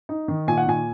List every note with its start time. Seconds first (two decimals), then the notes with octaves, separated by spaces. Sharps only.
0.09 D#4
0.28 D#3
0.47 A#2 G#5
0.57 F#5
0.67 A#2 G#5